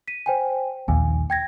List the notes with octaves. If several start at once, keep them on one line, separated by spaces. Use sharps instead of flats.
B6 D#7
C5 G5 G#5
A#1 D#2 G#5
G5 G#6 A#6